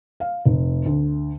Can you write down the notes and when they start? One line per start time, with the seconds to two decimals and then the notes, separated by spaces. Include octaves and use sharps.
0.20 F5
0.46 F1
0.86 D2